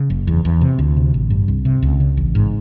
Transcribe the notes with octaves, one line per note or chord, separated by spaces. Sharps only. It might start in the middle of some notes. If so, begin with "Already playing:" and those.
Already playing: C#3
F#1
E2
E2
C3
D2
C3
A1
G2
C2
C3
C#2
C#3
A1
G#2